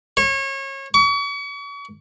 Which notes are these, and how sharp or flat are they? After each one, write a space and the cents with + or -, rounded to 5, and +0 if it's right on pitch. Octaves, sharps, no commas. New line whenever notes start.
C#5 -30
C#6 +40